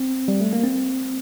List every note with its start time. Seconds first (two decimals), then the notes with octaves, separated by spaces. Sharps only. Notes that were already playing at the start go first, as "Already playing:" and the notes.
Already playing: C4
0.28 G3
0.41 A3
0.53 A#3
0.64 C4